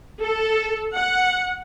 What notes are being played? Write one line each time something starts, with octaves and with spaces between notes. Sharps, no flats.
A4
F#5